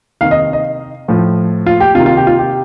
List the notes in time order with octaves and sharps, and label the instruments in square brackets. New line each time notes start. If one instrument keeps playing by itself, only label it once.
[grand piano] C3 D#3 F5
D#5
D#5
A2 F3
F4
G4
C3 F4
D#3
F4
G4
F4
G4